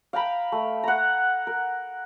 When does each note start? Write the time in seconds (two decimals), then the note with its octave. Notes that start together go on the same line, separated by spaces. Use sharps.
0.13 F5 G5 A#5 B5
0.52 A3
0.83 F#5 A#5
1.47 A#4